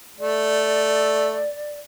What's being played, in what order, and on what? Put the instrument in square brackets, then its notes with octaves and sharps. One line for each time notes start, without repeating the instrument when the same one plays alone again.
[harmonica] A3 [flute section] D5